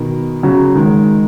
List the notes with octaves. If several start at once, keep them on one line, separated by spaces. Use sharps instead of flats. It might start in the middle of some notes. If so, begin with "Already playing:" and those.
Already playing: B2 D#3
C#3 F#3
D#3 G#3